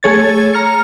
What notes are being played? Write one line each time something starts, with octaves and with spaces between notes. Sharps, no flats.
A3 G#4 C#5 G#6 A6
A#5 F6 C#7